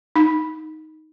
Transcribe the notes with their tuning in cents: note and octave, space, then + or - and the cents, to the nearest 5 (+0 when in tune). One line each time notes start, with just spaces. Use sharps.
D#4 +5